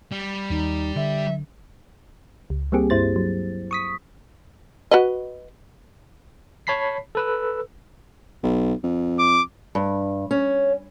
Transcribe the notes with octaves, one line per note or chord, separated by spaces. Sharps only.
G3
D#2 D#4
D3 E5
C#2
G3 A#3 C4 G4 G#4
G2 E4 C5 A6
F#3
C#6 D#6 B6
F#4 B4 D#5
C#5 A5 B5 B6 C7
A4 B4 E6
B1
F2
D6
G2
C#4